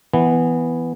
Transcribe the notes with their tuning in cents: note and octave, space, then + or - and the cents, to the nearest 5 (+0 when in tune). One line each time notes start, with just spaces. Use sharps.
E3 +0 B3 +0